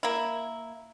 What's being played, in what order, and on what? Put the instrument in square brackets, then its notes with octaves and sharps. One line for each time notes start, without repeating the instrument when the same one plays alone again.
[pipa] A#3 E4